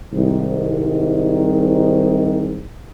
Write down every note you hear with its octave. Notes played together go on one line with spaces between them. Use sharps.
C2 G#2 D#3